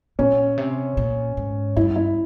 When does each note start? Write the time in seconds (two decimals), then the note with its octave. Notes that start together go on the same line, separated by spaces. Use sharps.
0.19 A#2 C#4
0.58 C3
0.97 A#2
1.37 G#2
1.76 G2 E4
1.96 E4